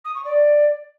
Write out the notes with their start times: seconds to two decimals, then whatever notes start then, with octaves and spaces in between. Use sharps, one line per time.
0.05 D#6
0.15 C#6
0.25 D5